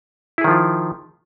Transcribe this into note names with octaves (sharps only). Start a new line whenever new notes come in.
D#3 F3 E4 F4 G#4